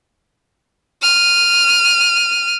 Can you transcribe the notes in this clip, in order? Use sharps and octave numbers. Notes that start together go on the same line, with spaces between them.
F6 D#7